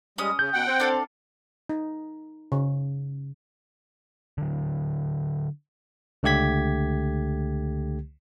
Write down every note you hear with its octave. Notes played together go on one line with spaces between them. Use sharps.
G3 G#3 C#4 D#6
C#3 G6
B2 F#5 G5
C4
D4 A4 F5
D#4
C#3
D3 F#3
C#2 D3 A3 G4 G#6 B6